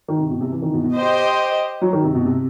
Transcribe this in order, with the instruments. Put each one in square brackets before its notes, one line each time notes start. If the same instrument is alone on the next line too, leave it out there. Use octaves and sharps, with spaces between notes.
[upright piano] D#3
C3
B2
C3
E3
D#3
B2
B2
[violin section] G4 C5 D#5
[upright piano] F#3
D#3
C3
B2
C3